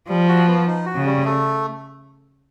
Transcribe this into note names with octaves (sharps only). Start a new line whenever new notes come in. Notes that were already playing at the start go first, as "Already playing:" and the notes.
F3 G3
F#4
B3
D#4
F#4
C#3
G3
A3